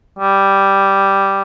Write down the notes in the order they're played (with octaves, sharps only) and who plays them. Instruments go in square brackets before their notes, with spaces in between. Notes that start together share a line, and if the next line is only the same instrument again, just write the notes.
[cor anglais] G3